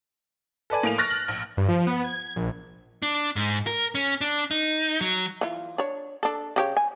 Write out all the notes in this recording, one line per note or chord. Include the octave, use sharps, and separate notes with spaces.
A4 B4 D5 G#5
A2 A#3 D7 F7
C#6 F6 F#6 A6 A#6
F#7
A#1
G2
F3
B3
G#6
A#1
D4
G#2
A#4
C#4
D4
D#4
F#3
E3 F4
D4 C#5
D4 A4
C#3 G4 C#5
G#5